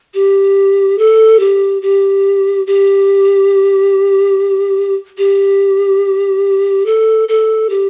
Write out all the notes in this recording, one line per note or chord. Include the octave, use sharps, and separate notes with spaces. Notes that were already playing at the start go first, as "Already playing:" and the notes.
G4
A4
G4
G4
G4
G4
A4
A4
G4